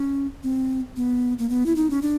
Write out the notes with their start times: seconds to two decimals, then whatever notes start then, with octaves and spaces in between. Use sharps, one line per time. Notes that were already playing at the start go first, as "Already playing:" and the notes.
Already playing: C#4
0.43 C4
0.97 B3
1.39 A#3
1.49 B3
1.66 E4
1.76 D#4
1.90 C#4
2.02 D4